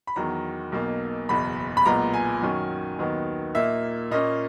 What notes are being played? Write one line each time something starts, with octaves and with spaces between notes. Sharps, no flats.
B5
E2 D#3 F#3 A#5
B1 B2 A#3 D#4
F#1 E2 B2 B5
B5
B1 A#2 G#3 B3 A#5
G#5
F#2 D#3 F#3 C#4
D#2 D#3 F#3 B3 D#4
A#2 A#3 D#4 E5
A#2 A#3 C#4 D#5